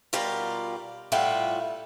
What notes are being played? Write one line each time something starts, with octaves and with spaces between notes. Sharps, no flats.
B2 G3 F4 G4 A#4
A2 G3 F4 E5 F#5 G5